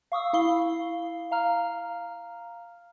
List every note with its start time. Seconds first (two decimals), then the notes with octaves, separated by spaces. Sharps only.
0.12 F5 C#6 D#6 E6
0.33 E4 F5 C7 G7
1.31 F5 A#5 F6